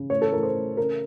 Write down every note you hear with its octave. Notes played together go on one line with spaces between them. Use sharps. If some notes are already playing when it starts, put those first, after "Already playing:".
Already playing: C#3
A2 C#5
A4
A2 A#4
C5
A3
C#3 A#4